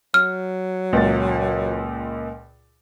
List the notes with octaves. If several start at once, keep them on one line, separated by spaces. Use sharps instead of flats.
F#3 F6
C#2 A#2 A6